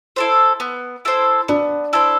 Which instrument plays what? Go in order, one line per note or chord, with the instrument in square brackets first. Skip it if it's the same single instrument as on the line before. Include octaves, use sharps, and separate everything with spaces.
[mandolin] E4 A4 C5
B3
E4 A4 C5
[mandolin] B3 [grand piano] D4
[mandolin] E4 A4 C5